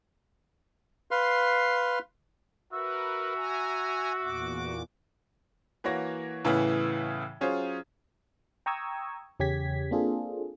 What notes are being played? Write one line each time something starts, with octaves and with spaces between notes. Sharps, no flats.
B4 F5 C6
F#4 A#4 B4 E5
G#5 A#5
E2 A#2 D6
E3 A#3 F#4 C#5 A#6
A2 C#3 E3 B3 C#4 E4
F#3 C#4 F4 G#4 C5
G5 A#5 C#6 D#6 E6 G#6
E2 C#3 C#4 G4 G#6 B6
A#3 C4 D4 F4 G#4 A4